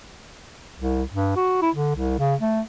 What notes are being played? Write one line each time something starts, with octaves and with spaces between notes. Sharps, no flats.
C2
G2
F#4
E4
D3
C2
C#3
A3